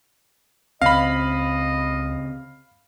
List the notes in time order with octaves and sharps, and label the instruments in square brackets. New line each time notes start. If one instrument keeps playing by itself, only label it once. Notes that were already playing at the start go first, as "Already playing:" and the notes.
[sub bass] C#2 [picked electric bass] C#3 C4 [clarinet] D#5 [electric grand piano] F5 B5